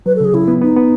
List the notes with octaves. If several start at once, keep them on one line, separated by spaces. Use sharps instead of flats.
F#3 B4
A4
C#3
G#4
C#3 E4
B3
B3 D#4
B3